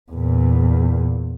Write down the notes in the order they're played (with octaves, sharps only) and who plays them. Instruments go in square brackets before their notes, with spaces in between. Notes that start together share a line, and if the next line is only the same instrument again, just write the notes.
[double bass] E2 A#2